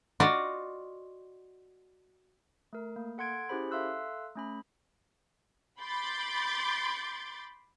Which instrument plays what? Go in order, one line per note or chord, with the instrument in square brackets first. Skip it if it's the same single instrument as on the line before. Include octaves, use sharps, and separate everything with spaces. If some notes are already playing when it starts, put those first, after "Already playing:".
[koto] F4 F#4 D5 D#5
[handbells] A3 A#4
A#3
A4 F#5 C6 G#6 D7
C#4 E4 G4 G#4 C5 B5
A4 E5 F5 C6 E6 F#6
A3 C#4 B5
[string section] B5 C6 D6 G6 A6